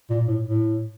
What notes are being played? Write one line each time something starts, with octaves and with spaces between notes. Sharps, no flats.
A#2
A2
A2